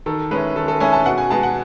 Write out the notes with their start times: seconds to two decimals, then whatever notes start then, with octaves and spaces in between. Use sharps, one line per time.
0.06 D#3 A4
0.31 G#3 C#4 E4 B4
0.56 D#3 A4
0.68 A4
0.80 G#3 C#4 E4 G#5
0.93 A5
1.05 B2 F#5
1.18 G#5
1.31 G#3 B3 A5
1.43 F#5